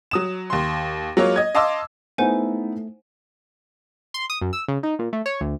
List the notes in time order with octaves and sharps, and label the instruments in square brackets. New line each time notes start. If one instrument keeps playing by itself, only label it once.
[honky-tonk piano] F#3 D#6 E7
D#2 C6
F#3 G#3 A#3 F4 C#5
D#5 G#6
D#5 F5 A5 C6 D6 E6
[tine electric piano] A3 [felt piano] B3 D#4 E4 [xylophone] C5 F#5 G#5
[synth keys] C6
D#6
F#2
E6
C#3
D#4
A#2
A3
C#5
D2